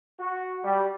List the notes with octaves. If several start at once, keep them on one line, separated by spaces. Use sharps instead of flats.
F#4
G3